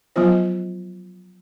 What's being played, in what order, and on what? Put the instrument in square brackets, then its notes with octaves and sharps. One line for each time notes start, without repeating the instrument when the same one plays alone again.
[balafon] F3 F#3 B3 F4 C5